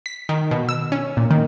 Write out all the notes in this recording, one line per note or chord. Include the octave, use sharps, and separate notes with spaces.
B6
D#3
B2
E6
C#4
A#2
D#3